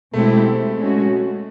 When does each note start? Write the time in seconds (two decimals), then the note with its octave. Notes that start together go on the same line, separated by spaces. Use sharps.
0.13 B2 G#3 A3 C4 E4 G4
0.77 G#3 C#4 F#4